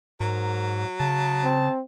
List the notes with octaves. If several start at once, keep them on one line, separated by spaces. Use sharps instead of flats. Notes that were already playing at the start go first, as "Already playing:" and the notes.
G#2 F#3 A#4
C#3 A5
C4